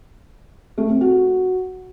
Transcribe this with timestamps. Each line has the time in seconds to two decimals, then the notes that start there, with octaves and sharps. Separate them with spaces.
0.78 A3
0.89 C4
1.01 F#4